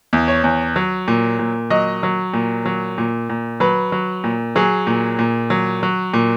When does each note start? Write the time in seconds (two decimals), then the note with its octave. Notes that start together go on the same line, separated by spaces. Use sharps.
0.13 E2
0.28 C#5
0.44 E2
0.76 F#3
1.08 A#2
1.39 A#2
1.70 F#3 D#5
2.03 F#3
2.34 A#2
2.65 F#3
2.98 A#2
3.30 A#2
3.60 F#3 B4
3.92 F#3
4.24 A#2
4.56 F#3 G#4
4.87 A#2
5.19 A#2
5.50 F#3
5.83 F#3
6.14 A#2